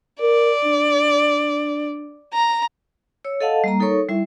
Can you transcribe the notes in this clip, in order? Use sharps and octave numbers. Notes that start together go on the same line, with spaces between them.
A#4 D5
D4
A#5
C#5 E6
A4 D#5 F5 F#5 A5
G3 A#3 A#5
D#4 A4 A#4 C#5 C#6
G3 E4 E5